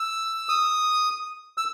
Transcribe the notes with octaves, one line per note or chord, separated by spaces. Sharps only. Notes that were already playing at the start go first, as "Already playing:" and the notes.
Already playing: E6
D#6
E6